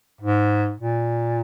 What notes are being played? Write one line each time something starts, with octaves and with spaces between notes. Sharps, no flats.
G#2
A#2